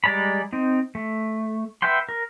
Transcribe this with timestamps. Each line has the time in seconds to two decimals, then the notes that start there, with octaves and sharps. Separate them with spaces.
0.04 G3 G#3 D5 A#5 B5
0.53 C4 D#4
0.95 A3
1.82 B4 E5 F#5 G5 C6
2.09 A#4